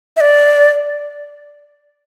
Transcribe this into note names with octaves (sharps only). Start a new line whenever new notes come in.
E5
D5